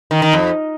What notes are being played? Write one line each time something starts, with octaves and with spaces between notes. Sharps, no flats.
D#3
D#3
F2